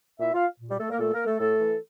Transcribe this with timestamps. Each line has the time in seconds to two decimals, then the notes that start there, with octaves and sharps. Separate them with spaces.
0.20 A#2 E4 E5
0.34 F4 F5
0.60 A#2
0.70 G3 G4
0.80 A3 A4
0.90 A#3 A#4
1.00 A#2 A3 A4
1.14 A#3 A#4
1.27 A3 A4
1.39 A2 A3 A4
1.60 E3